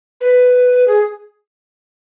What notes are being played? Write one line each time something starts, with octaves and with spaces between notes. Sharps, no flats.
B4
G#4